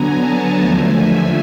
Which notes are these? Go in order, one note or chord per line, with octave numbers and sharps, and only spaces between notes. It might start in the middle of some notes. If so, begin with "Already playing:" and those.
Already playing: D3 F#3 B3 G#5 A#5
A5
D#2 D3 F3 A3 G#5
E5